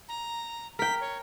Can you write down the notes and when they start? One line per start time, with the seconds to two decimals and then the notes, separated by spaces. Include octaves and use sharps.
0.08 A#5
0.79 A#4 G5 B6
1.00 C#5